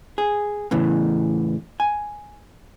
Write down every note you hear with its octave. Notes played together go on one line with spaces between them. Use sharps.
G#4
E2 A2 C#3 E3
G#5